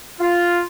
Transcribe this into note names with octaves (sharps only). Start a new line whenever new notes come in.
F4